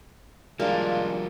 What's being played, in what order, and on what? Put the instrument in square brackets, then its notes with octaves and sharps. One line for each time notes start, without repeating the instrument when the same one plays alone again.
[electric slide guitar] F3 G3 [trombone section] G#3 D4 F4 [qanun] A#3 [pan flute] D5